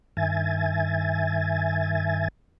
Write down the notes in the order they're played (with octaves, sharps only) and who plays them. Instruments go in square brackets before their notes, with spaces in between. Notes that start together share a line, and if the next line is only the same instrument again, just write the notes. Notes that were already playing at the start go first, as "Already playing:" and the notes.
[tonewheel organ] G2 D#3 E5 G#5 G#6 A6